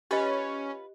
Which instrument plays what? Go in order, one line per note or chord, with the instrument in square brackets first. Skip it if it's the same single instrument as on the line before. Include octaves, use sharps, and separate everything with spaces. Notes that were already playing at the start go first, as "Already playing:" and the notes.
[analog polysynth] C#4 [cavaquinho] F4 B4 B5 [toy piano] G4 D#5